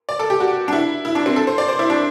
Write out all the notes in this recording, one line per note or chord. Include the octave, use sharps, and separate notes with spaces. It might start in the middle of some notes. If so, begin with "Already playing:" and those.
D5
A4
G4
F#4
D4
E4
E4
D4
C4
A4
C5
D5
C5
E4
D4